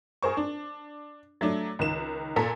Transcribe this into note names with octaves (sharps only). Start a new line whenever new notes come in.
G#4 A#4 C5 C#6
D4
F#3 A3 D4
C#2 D#3 E7
A#2 A4 A#5 B6